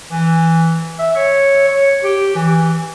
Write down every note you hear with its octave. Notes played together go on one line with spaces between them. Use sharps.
E3
E5
C#5
C#5
G4
E3